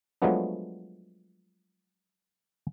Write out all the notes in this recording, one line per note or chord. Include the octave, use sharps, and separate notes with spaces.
F3 F#3 G#3 A3 B3 D4